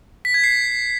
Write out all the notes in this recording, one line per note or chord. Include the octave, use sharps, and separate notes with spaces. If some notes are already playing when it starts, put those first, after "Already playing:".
B6
G#6
C7